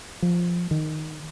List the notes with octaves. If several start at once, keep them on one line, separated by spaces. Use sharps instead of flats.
F3
D#3